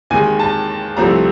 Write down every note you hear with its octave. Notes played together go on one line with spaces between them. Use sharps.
D#2 D#3 G#3 G#5
A5
C2 C3 F3 A3 C4 A#5